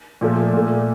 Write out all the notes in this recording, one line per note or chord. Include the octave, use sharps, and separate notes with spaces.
A#2 F3 A3
A#2 A3